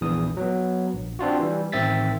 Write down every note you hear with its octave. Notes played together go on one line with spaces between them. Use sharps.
A#1 E2 E3 D#6
F#3 B3
A#1
C4 D4 F4 F#4
E3 G3
A1 D#3 C4 E5 A6 B6